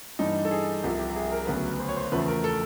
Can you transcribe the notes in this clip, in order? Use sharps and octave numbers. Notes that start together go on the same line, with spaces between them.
G2 E3 G3 D#4
A4
G#4
C2 C3 F3 G4
G4
G#4
A#4
D2 C#3 F#3 B3 B4
C5
C#5
C5
E2 C#3 F3 A3 B4
A#4
A4